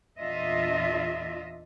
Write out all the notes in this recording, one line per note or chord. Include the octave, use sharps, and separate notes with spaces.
E2 A#2 D4 F4 D#5 E5